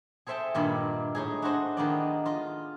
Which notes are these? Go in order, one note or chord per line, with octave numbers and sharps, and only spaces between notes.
G#4 A4 C5 E5 G5 A5
G2 A#2 D#3 A#3 D5 B5
A2 D#4 G#4
D4 F#4 C5 D#5
D#3 A#3 B3 D4 D#4 D5
F4 D#5